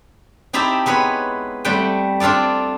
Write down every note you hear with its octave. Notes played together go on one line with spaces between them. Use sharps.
C4 D#4 E4 G4 E5 A5
G#3 B3 B4 C#5
G3 A3 C4 F#5 G5
C4 D4 F4 A4 D5